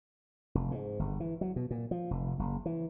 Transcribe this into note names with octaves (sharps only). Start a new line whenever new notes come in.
F1
G#2
G1
E3
F#3
B2
A#2
F3
F1
F#1
E3